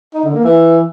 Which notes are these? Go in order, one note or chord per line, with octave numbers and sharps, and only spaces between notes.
D#4
D3
A#3
E3